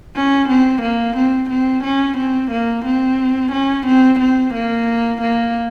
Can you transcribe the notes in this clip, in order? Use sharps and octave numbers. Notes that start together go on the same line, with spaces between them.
C#4
C4
A#3
C4
C4
C#4
C4
A#3
C4
C#4
C4
C4
A#3
A#3